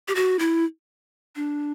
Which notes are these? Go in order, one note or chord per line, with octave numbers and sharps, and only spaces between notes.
G4
F#4
E4
D4